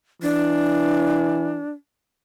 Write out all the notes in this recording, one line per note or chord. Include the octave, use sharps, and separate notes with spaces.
E3 D4